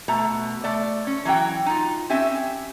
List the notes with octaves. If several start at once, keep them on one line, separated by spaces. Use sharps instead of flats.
B2 A3 A#5
A3 D5
C#4
E3 F#3 F#4 G5
D#4 F4
C4 C#4 G4 E5 G#5